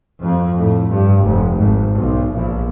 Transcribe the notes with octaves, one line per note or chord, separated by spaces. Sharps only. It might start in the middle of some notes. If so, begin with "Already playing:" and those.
F2
A2
G2
F1
G#1
B1
A#1